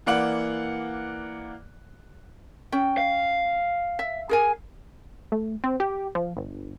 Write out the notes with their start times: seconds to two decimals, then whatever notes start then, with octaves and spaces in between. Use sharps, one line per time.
0.06 E3 A#3 D5 F#5 F#7
2.72 C#4 G5
2.98 F5
3.99 E5
4.29 G#4 A#4 G#5
5.32 A3
5.64 C4
5.80 G4
6.15 F3
6.37 G1